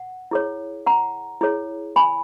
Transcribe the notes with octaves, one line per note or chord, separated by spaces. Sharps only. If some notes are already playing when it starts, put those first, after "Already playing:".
Already playing: F#5
E4 G#4 C#5
F#5 A#5
E4 G#4 C#5
G#5 B5